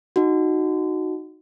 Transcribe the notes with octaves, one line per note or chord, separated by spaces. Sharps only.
D#4 F#4